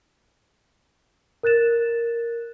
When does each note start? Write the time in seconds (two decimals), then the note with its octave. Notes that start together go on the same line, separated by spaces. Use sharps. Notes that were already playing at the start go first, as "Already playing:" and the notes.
1.43 A#4 F#6 A6 E7